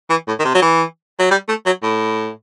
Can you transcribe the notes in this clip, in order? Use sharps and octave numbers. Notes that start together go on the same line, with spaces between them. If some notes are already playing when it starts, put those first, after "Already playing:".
E3
A2
D#3
C3
F#3
E3
F#3
G3
A3
F#3
A2